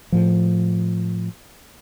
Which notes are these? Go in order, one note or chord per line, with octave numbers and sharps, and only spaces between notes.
A2 F3